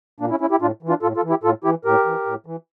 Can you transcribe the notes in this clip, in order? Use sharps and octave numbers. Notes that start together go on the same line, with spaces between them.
A#2 A#3 D4
C#4 E4
C#4 E4
E4 G4
A2 D4 F4
E3
D4 F4
A2 F4 A4
F4 A4
E3
E4 G4
A2 F4 A4
E3 E4 G4
A2 G4 A#4
E3
A2
E3